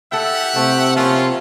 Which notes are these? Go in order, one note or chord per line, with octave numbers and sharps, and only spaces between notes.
E4 G4 A4 E5 F#5
C3 A3 E4
F3 A#3 C#4 F4